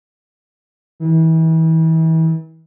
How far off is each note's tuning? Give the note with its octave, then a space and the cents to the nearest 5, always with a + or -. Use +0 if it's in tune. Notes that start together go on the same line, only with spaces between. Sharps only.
E3 -35